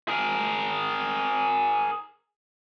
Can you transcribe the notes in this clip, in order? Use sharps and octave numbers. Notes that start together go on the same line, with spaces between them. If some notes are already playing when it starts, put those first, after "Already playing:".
G#4 A#4